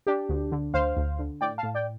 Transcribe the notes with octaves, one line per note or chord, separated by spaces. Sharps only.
D4 G4
D2
D3
D2 C5 F5
D2
D3
A2 D5 G5
F5 A5
A2
D5 G5